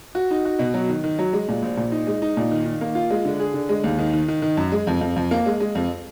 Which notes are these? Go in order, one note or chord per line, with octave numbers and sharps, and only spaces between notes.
F#4
D#4
F#4
B2
F#3
D#3
D#3
F#3
G#3
A#2
A#1
A#2
D#4
G#3
D#4
A#2
D#3
D#3
A#3
F4
G#3
D3
G#4
D3
G#3
D#2
D#3
D#3
D#3
D#3
F#2
G#3
F2
F2
F2
A#3
G#3
G#3
F2